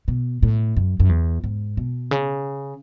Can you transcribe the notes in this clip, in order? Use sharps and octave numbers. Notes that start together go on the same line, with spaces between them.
B2
A2
F#2
F#2
E2
G#2
B2
C#3